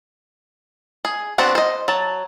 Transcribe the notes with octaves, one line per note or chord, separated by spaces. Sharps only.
G#4
B3 C4 D4 F#4 C5
C5 D#5
F#3 A5